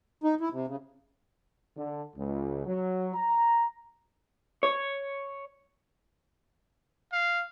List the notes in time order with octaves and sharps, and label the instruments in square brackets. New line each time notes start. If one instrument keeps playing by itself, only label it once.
[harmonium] D#4
E4
C3
C#3
[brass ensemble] D3
C#2
F#3
A#5
[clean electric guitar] C#5
[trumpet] F5